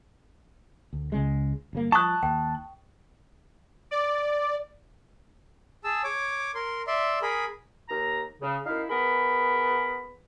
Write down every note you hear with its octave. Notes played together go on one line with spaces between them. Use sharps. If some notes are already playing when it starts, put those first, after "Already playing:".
D2
C#2 C#3 G#3
G1 C#3 A#3
F3 A5 C#6 D#6 F#6
D#2 G5
D5
G#4 A5 E6
C#5 D6
A#4 C6
D5 E5 C6
G#4 A#4 B5
D#2 A#5
C#3
F#2 D#4 E4 F5
B3 G#4 A#4 B5